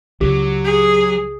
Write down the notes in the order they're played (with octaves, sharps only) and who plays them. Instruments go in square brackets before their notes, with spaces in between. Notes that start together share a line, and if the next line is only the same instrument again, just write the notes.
[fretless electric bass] C#2 [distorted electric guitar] F#3 [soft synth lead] G4
[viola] G#4